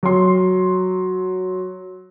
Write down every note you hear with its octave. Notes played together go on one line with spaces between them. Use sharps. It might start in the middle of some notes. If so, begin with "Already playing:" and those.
F#3 C6